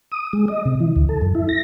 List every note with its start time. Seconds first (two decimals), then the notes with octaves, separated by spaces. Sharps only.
0.12 D#6
0.33 G#3
0.48 D#5
0.65 C3
0.80 E3
0.96 D2
1.09 A4
1.22 F#2
1.35 E4
1.49 A#6